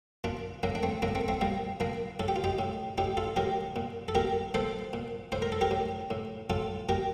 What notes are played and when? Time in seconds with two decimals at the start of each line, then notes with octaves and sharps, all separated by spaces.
0.24 A#2 D4 F4
0.63 A2 A#3 D4
0.75 D4
0.83 A3 C4
1.02 A2 A#3 D4
1.15 A3 C4
1.28 A3 C4
1.41 A#2 G3 A#3
1.80 A#2 A#3 D4
2.20 A2 A4
2.28 G4
2.36 F4
2.44 D#4 G4
2.59 A2
2.98 A2 D#4 G4
3.17 F4 A4
3.36 A2 G4 A#4
3.76 A#2
4.08 A4
4.15 A#2 G4 A#4
4.54 A#2 A4 C5
4.93 A#2
5.32 A2 C5
5.42 A#4
5.52 A4
5.61 G4 A#4
5.71 A2
6.11 A2
6.50 A2 F4 A4
6.89 A#2 G4 A#4